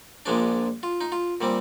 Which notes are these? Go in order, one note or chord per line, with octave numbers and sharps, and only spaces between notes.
A#1 A#2 F3 G#3 D4
F4
D#4
F4
A#2 G3 C4